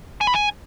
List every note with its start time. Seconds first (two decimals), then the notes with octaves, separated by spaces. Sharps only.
0.21 G#5
0.27 B5
0.34 G#5